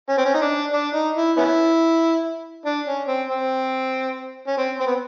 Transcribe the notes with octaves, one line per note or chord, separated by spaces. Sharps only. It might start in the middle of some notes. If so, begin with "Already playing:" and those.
C#4
C4
C#4
D#4
D4
D4
D#4
E4
B3 C#4 E4
D4
C#4
C4
C4
C#4
C4
C4
B3